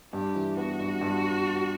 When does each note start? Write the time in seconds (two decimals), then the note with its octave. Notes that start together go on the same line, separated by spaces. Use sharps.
0.13 G2 G4
0.35 E3
0.57 B3 F#4
0.79 G2
1.01 G2